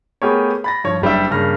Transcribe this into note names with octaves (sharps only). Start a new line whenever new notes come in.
A3 B3 G4 G#4 A#4 C#5
B5 A6 A#6
G2 F3 C#5 C#6
F#1 G3 D4 E5
G2 C#3 A#3 F6 A#6